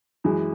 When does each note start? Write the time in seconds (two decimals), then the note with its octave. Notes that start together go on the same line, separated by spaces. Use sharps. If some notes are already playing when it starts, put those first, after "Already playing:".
0.24 F#2 E3 G#3